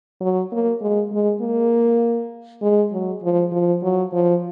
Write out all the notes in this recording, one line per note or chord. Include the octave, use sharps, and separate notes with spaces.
F#3
A#3
G#3
G#3
A#3
G#3
F#3
F3
F3
F#3
F3